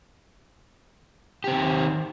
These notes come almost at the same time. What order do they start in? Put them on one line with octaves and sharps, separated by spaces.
G4 C4 D#3